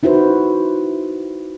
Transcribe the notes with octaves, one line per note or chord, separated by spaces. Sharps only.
D#4 E4 F#4 B4 C5